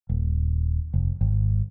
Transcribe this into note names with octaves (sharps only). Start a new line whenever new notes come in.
D#1
F1
G#1